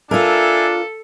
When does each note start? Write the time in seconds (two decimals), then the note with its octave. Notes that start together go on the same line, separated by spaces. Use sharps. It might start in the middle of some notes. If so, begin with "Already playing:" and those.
0.11 D4 F4 A4 A#4 E5 G#5